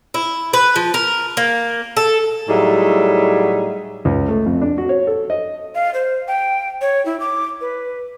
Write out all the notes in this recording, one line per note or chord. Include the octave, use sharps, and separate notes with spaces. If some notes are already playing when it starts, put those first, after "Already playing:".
E4
B4
F3
A#4
A#3
A4
A2 F#3 G3 D#4 G#4 E5
C#2
A3
F2
D4
F#4
C#5
A4
D#5
F5
C5
G5
C#5
E4
D6
B4